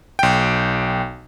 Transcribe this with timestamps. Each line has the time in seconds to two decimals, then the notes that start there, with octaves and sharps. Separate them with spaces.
0.19 B1 G5